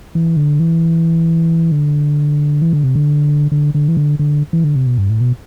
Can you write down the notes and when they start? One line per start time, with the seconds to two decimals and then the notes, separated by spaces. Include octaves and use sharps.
0.15 E3
0.37 D3
0.60 E3
1.72 D3
2.62 E3
2.73 D3
2.84 C3
2.95 D3
3.52 D3
3.75 D3
3.88 E3
3.97 D3
4.19 D3
4.53 E3
4.64 D3
4.76 C3
4.87 B2
4.98 G2
5.10 A2
5.21 B2